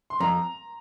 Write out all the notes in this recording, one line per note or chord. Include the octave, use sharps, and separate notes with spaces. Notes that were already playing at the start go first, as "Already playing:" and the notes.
C6
F2 A#5